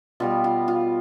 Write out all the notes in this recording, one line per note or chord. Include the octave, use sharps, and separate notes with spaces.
B2 G3 B3 F4
F4
F4